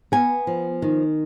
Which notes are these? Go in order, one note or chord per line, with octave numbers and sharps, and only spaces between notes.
B3 G#5
F3
D#3